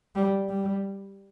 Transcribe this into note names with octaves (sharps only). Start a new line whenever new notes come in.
G3
G3